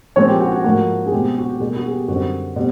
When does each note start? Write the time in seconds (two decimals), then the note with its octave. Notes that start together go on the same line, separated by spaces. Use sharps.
0.16 A#2 F3 G#3 C4 C#5
0.28 G4
0.41 F#4
0.52 F#4
0.64 G#2 F3 A#3 F#4
1.06 G#4
1.12 B2 G#3 C4 G4
1.38 F#4
1.49 G4
1.60 E2 B2 G3 A#3 G#4
1.76 F#4
1.86 G#4
1.92 G4
2.08 F#2 D3 G3 C4 F#4
2.56 B2 G3 C4